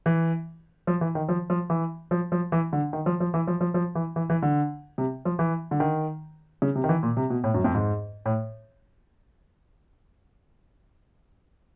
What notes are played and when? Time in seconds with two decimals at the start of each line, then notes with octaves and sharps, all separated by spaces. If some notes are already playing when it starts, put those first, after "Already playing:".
0.06 E3
0.87 F3
1.01 E3
1.15 D#3
1.29 F3
1.50 F3
1.70 E3
2.11 F3
2.32 F3
2.52 E3
2.73 D3
2.93 D#3
3.06 F3
3.20 F3
3.34 E3
3.47 F3
3.61 F3
3.74 F3
3.95 E3
4.16 E3
4.30 E3
4.43 D3
4.98 C3
5.25 F3
5.39 E3
5.71 D3
5.80 D#3
6.62 C#3
6.75 C3
6.84 D#3
6.89 E3
7.03 A#2
7.17 C3
7.30 B2
7.44 A2
7.54 F#2
7.64 F2
7.75 G#2
8.26 A2